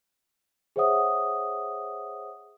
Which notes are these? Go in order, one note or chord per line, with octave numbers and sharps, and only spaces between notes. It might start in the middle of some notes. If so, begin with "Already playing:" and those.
G#4 C5 C#5 E5 F#5 D#6